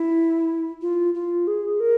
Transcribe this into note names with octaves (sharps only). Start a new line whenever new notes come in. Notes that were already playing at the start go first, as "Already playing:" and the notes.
Already playing: E4
F4
F4
G#4
A#4